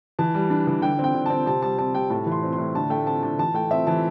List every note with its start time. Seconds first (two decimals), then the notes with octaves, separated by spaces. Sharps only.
0.19 E3 A5
0.34 G3
0.50 D4
0.67 E3
0.82 D3 G5
0.99 C4
1.04 G5
1.14 D3
1.26 C4 A5
1.46 C3 A5
1.62 G3 A5
1.78 C4 A5
1.95 C3 G5
2.10 A2 A5
2.26 E3
2.32 C6
2.43 C4
2.53 C6
2.58 A2
2.75 D3 A5
2.90 A3 G5
3.06 C4 A5
3.23 D3 A5
3.38 E3 A5
3.54 A3 G5
3.71 C4 E5
3.87 E3 A5